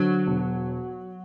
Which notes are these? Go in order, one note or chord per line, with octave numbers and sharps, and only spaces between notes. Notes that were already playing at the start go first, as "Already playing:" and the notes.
Already playing: D3 F#3
E1